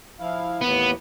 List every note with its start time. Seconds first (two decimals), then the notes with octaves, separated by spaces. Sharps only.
0.20 F3 E4 F5
0.61 D#2 A2 E3 B3